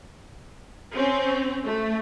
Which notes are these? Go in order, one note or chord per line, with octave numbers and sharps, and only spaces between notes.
C4 C#4
A3